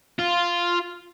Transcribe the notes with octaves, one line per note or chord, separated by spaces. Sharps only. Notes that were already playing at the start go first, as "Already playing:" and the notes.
F4